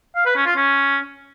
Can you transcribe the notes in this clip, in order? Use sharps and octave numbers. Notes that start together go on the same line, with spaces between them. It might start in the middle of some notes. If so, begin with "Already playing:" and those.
F5
B4
C#4
F4
C#4